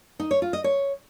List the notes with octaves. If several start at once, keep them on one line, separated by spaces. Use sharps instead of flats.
D#4
C#5
F4
D#5
C#5